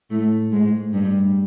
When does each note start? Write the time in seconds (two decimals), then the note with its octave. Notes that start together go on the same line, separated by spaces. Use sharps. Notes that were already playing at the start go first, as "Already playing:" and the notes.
0.10 A2 A3
0.52 G#2 G#3
0.93 G2 G3